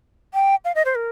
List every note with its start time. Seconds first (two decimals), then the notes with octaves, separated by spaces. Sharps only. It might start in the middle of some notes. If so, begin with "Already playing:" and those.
0.34 G5
0.65 F5
0.75 D#5
0.85 C5
0.95 A#4